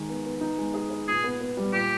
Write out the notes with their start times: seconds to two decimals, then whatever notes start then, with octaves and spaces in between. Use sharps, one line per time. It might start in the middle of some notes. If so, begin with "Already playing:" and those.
Already playing: D#3 G#3
0.09 B3
0.25 B3
0.41 D#4
0.58 G#3
0.74 G#4
0.90 B4
1.07 A#2 G#4
1.24 B3
1.41 B3
1.57 G3
1.73 A#2 G4